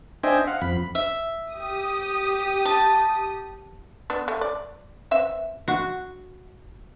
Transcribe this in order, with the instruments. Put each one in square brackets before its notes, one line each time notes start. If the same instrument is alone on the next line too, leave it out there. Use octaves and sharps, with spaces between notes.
[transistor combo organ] D4 C5 D#5 E5 G5 G#5
F5 F#5
F2 B5
[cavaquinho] E5
[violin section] G4 D#6
[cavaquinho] A5
[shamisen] B3 D4
A3
D5
E3 C4 E5
[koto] F#4